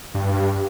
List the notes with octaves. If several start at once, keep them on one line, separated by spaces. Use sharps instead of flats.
G2